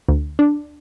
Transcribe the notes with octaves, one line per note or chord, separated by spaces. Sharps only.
D2
D4